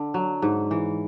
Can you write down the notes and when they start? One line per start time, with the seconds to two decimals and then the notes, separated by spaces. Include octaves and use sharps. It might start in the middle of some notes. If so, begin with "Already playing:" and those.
Already playing: D3
0.14 F#3
0.42 G#2
0.71 E3